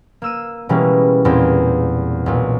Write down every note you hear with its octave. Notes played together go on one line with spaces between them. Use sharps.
A#3 E6 D#7
B2 E3 G3 G#3 A#3 C#4
E2 A#2 A#3 C4
B1 A#2